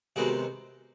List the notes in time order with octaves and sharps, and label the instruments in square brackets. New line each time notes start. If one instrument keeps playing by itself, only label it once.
[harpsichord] C3 D#3 G#3 B3 F#4 G#4